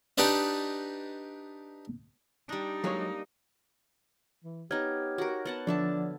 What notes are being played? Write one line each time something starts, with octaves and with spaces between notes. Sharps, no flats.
D4 D#4 G4 B4 D5 D#5
G3 D4 D#4
F#3 G#3 A#3 C#5
E3
B3 D#4 G4 C#5 F6 G#6
F#4 A#4
B3 F#5 A5
D3 F3 D4 E5 A5